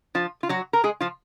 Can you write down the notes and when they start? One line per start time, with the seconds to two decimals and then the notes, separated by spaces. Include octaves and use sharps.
0.15 F3 F4
0.43 F4
0.49 F#3 F#4
0.73 A#4
0.84 G#3 G#4
1.01 F3 F4